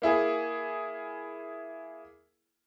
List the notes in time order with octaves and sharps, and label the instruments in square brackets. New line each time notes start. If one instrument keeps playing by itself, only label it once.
[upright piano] A#3 E4 G#4